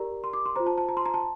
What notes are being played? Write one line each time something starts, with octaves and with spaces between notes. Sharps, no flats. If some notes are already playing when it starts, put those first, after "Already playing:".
Already playing: G4 A#4 D5 A#5
C6
D6
C6
F4 C5 A#5
A5
A5
A#5
C6
A#5
A5